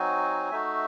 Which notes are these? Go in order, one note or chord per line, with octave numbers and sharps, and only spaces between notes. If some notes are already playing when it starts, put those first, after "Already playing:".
Already playing: F#3 C4 D#4 F#4 G#5
A3 D#4 F#4 E5